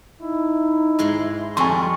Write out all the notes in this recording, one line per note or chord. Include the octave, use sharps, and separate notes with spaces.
D#4 E4
G#2 G#3 C6
F2 G3 D#4 G#5 C6 C#6